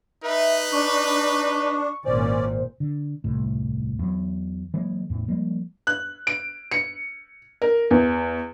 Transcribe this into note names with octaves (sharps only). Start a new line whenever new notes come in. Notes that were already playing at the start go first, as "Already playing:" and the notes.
D#4 B4 E5
D4 C#6
G#1 A#2 C#4 C5 D5
D3
D#1 C2 A2
E2 F#3
E3 F#3 G#3 A#3
E2 A2
F3 G3 G#3 A#3
F#6
D7
C#7
A#4
E2